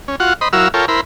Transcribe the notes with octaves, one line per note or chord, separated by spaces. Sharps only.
C#4
F4 F#4 F#5
C5 D#5 B5
F#3 E4 F#4 A#4 F5 E6
F4 A4 A#4 C#5 G5
E4 A#4 C5 B5